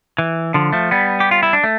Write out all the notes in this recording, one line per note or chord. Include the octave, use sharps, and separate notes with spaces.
E3
D3 F3
F3 A3
G3 B3
G4
F4
E4
D4
A3